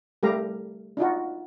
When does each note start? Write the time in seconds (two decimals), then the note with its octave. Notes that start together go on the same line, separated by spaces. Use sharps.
0.23 G3 A3 G4 A#4 F5 A#5
0.97 D4 D#4 F4 F#4